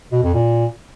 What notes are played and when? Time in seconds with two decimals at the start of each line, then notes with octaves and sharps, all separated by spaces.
0.12 B2
0.23 F2
0.34 A#2